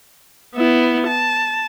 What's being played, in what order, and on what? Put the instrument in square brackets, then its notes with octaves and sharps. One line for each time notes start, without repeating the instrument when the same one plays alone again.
[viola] B3 E4
A5